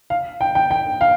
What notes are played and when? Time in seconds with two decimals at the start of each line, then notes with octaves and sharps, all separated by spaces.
0.10 F5
0.41 G5
0.55 G5
0.71 G5
1.01 F5